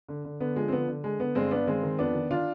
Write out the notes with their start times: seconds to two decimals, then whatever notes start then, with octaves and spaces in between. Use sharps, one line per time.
0.09 D3
0.25 D3
0.40 D3 B3
0.56 F3 G#3
0.68 C4
0.72 D3 B3
0.88 D3
1.04 D3 G#3
1.19 D3 B3
1.35 G2 G#3 C4
1.51 G2 B3 D4
1.67 D#3 G#3 C4
1.83 D#3
1.98 F2 B3 D4
2.15 D#3
2.30 D#3 D4 F4